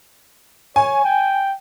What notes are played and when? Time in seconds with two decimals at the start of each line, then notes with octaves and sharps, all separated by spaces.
0.76 C#5 G#5
1.04 G5